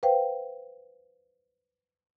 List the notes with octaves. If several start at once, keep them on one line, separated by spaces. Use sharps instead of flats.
B4 C5 F5 G5